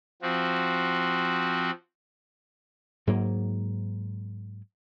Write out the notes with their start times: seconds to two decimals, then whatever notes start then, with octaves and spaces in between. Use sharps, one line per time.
0.22 F3 C4 F#4
3.07 G#2 F#3 A#3